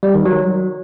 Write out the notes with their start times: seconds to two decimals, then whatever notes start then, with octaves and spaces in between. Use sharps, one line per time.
0.03 G3
0.14 D#3
0.25 F#3